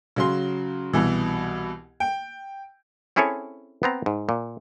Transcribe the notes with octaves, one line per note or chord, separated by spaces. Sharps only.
C#3 F#3 C6
C2 B2 E3
G5
C4 C#4 E4 G#4 A4 C#5
B3 C4 A#5
G#2
A#2